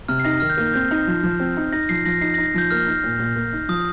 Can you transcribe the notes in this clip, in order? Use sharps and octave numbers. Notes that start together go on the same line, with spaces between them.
C3 F6
C7
D#4 A#6
D#3 F6
G6
A#3
C4 G6
D#4
F3
F3
C4
D#4
D#4 A#6
F3 C7
F3 A#6
D#4 C7
A#6
D#4
A#6
F3 G6
A#3 F6
D#4
A#2
A#2
A#3
D#4
F3 D#6